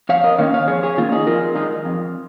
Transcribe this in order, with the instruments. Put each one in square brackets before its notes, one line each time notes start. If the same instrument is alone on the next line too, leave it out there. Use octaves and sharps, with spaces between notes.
[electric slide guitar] F2 C#5 F5
A#4 D#5
D#3 A#3 C#4 C#5 F5
C#5 F5
F2 G#4 C#5
G#4 C#5
D#3 A#3 C#4 F4
D#4 G#4
F2 F4 A#4
D#3 G#3 D#4
F2